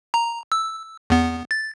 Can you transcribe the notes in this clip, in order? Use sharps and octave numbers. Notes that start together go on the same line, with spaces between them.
A#5
E6
E2 B3
A6